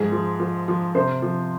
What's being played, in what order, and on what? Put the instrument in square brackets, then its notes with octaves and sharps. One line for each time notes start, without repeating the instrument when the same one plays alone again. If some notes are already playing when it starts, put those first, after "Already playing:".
Already playing: [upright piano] G#2 F3 G#4
F3
F3
F3
C3 C5
F3